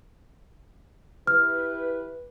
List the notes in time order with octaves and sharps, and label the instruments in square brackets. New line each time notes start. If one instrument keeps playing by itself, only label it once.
[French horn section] E4 G4 B4 [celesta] F6